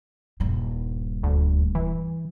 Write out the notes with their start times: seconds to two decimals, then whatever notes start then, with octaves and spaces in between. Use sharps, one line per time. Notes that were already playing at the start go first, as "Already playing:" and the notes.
0.40 D#1 G2
1.23 D2
1.75 E3